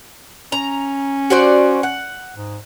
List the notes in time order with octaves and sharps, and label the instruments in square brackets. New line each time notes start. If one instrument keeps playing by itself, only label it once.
[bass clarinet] C#4 [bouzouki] A#5
[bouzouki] F#4 C5 D5
F#5
[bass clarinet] G#2